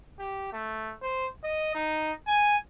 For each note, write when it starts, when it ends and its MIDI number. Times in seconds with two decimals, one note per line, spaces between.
0.19 0.51 67
0.53 0.94 57
1.02 1.28 72
1.44 1.75 75
1.75 2.13 63
2.28 2.57 80